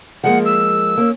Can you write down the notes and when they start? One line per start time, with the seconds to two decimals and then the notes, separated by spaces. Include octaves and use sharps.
0.24 F3 G#3 A#3 F#5
0.45 E6
0.98 A#3 C#4